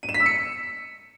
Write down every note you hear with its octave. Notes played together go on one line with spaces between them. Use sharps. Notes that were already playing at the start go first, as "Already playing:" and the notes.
D#7
E7
B6
E6
C#7